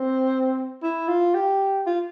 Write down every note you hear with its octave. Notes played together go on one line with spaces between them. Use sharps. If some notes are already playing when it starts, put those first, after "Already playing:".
Already playing: C4
E4
F4
G4
F4